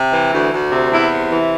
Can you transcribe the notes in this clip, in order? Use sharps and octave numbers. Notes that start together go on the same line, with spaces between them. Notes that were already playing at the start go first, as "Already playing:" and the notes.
Already playing: C3
E3
D2
D2
C3
E2 E4
C3
E3